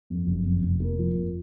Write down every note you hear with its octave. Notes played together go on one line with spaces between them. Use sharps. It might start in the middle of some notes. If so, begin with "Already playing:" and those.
F2
F#1
F2
F1
A#3
F3
F2